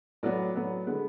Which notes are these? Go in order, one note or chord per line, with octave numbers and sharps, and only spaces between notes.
A2 F#3 B3 D5
A2 F#3 B3
D3 G#3 B3